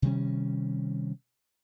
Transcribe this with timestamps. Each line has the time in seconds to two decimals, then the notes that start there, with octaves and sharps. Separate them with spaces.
0.02 C3 D#3 G3 C#4